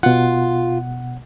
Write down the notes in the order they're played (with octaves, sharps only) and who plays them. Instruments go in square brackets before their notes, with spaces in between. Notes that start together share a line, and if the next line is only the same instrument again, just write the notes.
[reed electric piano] B2 F#5 [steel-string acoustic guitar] F4